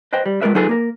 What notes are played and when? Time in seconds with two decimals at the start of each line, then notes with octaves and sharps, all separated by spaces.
0.13 B4 C5 D#5 G5
0.26 G3
0.41 G#3 B3 F4 A#4 B4 E5
0.55 F#3 D#4 F4 G#4 A4 B4
0.69 A#3 A#4